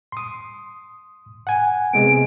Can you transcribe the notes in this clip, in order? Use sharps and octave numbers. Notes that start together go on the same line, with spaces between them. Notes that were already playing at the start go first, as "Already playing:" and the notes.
C6 D#6
F#5 G#5
C3 G#3 B3 D7